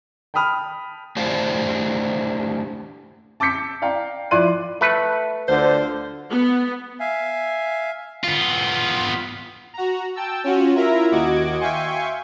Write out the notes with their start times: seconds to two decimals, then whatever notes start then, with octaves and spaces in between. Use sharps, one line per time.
0.34 G5 A5 B5 D#6 F6
1.16 A3 D4 E4 G4 C5 F5
3.40 A5 D6 E6 G6 B6 C#7
3.82 D5 F5 G5 A#5
4.31 F3 E4 D5 C6 F#6 D#7
4.81 A3 B4
5.49 D2 D3 F4 C5
6.29 B3
7.00 E5 F5 G#5
8.24 B3 F4
9.74 F#4 A#5
10.16 G5 A5 E6
10.44 C#4 F4 F#4
10.76 E4 F4 A#4 E5 A#5
11.11 D#2 F#4 D#5 D6 G#6
11.59 E5 F5 G5 G#5 C6 C#6